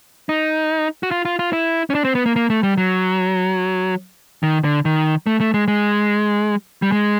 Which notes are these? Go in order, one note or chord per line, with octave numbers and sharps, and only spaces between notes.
D#4
F#4
F4
F4
F4
E4
C#4
D4
C4
B3
A#3
A#3
A3
G3
F#3
D#3
D3
D#3
A3
A3
G#3
G#3
G3
G#3